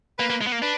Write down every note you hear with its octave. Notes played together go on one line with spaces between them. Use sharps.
A#3 B4
A#3
G#3
B3
A#3
D4 B4